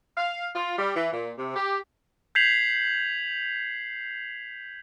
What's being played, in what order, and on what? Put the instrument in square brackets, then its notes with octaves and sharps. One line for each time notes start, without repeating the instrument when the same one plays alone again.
[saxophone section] F5
F4
G3
E3
A#2
C3
G4
[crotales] G6 G#6 B6 C7 F7 F#7